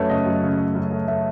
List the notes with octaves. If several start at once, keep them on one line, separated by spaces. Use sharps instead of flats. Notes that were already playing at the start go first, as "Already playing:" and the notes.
Already playing: F#2 F#3 A3 A4 B4 C#5
C#3 D#5
F#2
C#3
A3
F#2
A3
A3 E5